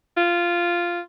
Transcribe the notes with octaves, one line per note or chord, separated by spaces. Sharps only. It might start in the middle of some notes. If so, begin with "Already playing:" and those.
F4